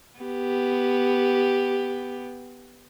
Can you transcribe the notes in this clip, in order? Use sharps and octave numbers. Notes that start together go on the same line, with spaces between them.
B3 G4